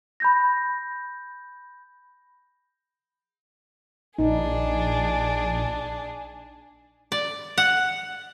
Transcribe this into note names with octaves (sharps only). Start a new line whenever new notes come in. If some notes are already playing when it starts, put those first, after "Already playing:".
B5 G6 A#6
A#1 D4 D#4 G#4
D5
F#5